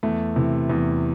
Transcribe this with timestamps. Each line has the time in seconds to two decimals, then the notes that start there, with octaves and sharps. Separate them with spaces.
0.03 E2 A3
0.36 C3 E3
0.70 E2